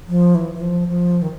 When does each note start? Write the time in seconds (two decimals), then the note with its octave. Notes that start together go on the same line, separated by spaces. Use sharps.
0.08 F3
0.35 E3
0.54 E3
0.61 F3
0.88 F3
1.22 D#3